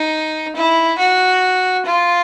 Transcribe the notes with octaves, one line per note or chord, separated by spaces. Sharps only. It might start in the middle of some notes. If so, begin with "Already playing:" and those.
Already playing: D#4
E4
F#4
F4